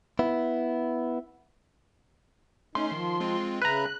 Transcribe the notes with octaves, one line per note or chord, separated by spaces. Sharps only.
B3 E4
A3 C#4 D#4 C6
D#3 F3
G#3 C4 F4
C#3 B4 E5 A#5 B5 F#6